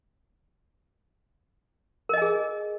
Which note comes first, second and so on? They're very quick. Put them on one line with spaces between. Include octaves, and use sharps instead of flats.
A#4 D#5 G#5 G#4